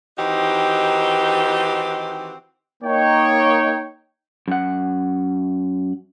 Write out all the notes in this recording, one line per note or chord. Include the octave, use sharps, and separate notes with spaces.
D#3 E3 C4 D#4 F#4 G4
A#3 D#4 C#5 G5
F#2 F#5